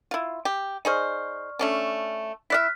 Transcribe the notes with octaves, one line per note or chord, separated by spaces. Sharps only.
E4 F4
G4
D#4 G#4 C5 D5 C#6 F6
A3 C#4 D4
E4 D5 E5 F6 F#6 B6